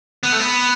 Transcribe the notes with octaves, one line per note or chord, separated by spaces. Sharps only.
B3
A3
B3